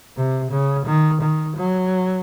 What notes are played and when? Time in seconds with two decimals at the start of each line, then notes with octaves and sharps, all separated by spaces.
0.17 C3
0.52 C#3
0.86 D#3
1.22 D#3
1.57 F#3